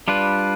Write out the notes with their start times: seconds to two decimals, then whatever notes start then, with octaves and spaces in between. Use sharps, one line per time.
0.08 G3 D4 F4 B4